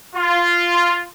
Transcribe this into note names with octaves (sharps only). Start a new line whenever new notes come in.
F4